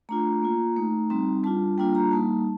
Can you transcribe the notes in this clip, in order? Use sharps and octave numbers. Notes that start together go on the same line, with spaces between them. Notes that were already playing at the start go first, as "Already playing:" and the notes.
A3 D4 F4 A#5
A#3 F4
A3 D#4
G3 C4 D#4
G3 D4 F4 A5
G3 A#3 D4 F4 G5
A#5
G3 A#3 D#4 A5